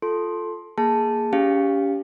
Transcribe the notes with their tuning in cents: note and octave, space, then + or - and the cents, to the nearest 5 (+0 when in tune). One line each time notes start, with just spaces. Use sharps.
F4 +0 A4 -5 C6 +10
A#3 +0 G#4 +0 A5 +0
C#4 +35 G4 +0 F5 +0